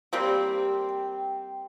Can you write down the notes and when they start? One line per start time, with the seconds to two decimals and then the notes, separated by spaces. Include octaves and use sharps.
0.13 G3 A#3 C4 G4
0.89 G5